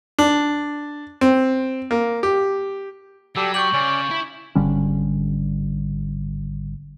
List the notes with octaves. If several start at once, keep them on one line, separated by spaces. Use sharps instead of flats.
D4
C4
A#3
G4
F#3 G3 G4 A4
G4 D5 C#6 G6 F#7
C#3 C#4 D5
E4 B5
G#1 D3 G3 C#4